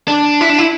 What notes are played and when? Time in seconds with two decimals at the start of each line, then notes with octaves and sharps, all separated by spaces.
0.08 D4
0.41 E4
0.50 D4
0.58 E4